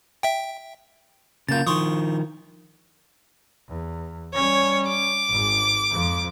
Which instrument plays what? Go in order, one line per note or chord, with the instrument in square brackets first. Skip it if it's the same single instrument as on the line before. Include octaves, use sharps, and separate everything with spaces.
[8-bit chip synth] E5 G5
[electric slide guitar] C#3 A#3 F4 [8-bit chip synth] G6 A6
[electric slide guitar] D#3 F3 [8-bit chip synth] C6 C#6 D#6
[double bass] E2
[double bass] G3 C#4 [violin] C#5
[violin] D6
[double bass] G#1 G#2
F2 F3